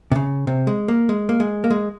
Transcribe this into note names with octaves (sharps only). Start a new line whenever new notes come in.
C3
C#3
C3
G#3
A#3
G#3
A#3
G#3
A#3
G#3